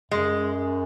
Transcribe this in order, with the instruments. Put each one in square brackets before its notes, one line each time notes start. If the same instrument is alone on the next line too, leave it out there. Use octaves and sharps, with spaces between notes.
[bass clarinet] F#2 [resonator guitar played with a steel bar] G#3